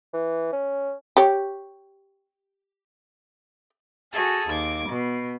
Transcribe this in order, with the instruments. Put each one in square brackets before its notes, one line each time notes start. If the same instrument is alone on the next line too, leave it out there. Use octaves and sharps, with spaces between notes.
[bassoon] E3
C#4
[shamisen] G4 C#5
[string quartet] F#4 G#4 A4 G#5
D#2 D6 G#6
B2